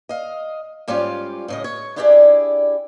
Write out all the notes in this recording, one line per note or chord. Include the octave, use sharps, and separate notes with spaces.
D#5 F5
G#2 G3 C#4 F4 G4 F5
A2 C#3 D#5
C#5
D4 E4 G4 G#4 C#5 D5